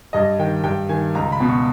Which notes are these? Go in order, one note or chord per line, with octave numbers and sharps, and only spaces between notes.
G2 D#5
D#3 G5
G2 G5
D#3 G#5
C#2 A#5
B5
B2
C#6